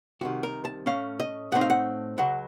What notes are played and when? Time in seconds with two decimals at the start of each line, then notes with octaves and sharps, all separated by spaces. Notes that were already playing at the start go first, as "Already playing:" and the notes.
0.21 C2 C3 D#3 F#4
0.43 A#4
0.65 A5
0.86 A2 A3 C#4 F5
1.20 D#5
1.52 A2 A3 C4 D#4 F#5
1.61 F5
1.70 F#5
2.18 C#2 C#3 F#3 F#5